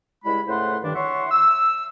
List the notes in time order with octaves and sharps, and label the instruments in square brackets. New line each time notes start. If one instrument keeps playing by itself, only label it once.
[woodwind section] C#2 G3 G#3 E4 B5
C#2 A2 A3 C5 F#5 C6
G2 D#3 D4
E4 C#5 E5 F#5 C6 C#6
E6